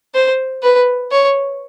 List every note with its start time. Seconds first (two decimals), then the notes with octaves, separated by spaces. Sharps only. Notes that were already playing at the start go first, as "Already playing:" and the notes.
0.15 C5
0.63 B4
1.12 C#5